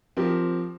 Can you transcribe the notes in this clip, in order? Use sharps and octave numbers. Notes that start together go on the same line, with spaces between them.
F3 C4 G4 A#4